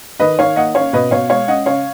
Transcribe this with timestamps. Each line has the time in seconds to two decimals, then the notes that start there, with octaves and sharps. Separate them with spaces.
0.20 D#3 B4 D#5
0.39 D#3 C#5 F5
0.56 A#3 D#5 F#5
0.75 C#4 C#5 F5
0.93 B2 B4 D#5
1.11 B2 C#5 F5
1.29 G#3 C#5 F5
1.48 C#4 D#5 F#5
1.66 C#3 C#5 F5